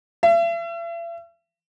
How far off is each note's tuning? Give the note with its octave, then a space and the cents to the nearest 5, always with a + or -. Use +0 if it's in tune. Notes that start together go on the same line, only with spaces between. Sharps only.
E5 +45